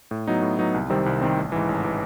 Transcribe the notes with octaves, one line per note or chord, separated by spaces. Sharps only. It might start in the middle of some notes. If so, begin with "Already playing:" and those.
A2
F#3 B3 D#4
A2
F#3 B3 D#4
C2
C3 D#3 G3 C4
C2
C3 D#3 G3 C4
A1
G#2 E3
A1
E3